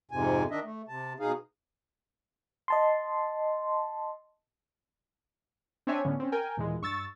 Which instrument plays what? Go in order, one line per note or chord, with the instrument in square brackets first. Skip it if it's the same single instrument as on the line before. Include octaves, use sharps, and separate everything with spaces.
[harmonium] F2 G#2 C3 G#5
D#3 D4 D#5 E5
A3
C3 A5
B2 D#4 G#4 F5
[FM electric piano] D#5 A5 C6
[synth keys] C4 D4 C#5 E5 G#5
A2 D3 B3 C#4
C4 C#4
A#4 G5 G#5
D#2 A#2 E3 G#3
G2 C#6 E6 A6